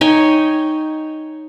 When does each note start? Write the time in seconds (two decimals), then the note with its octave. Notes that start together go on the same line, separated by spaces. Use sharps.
0.01 D#4 C#5 G5 G#5